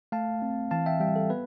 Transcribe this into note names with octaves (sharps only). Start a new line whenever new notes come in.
A3 F5 A5
C4
E3 F5 A5
E5 G5
G3 E5 G5
A4
B3 B4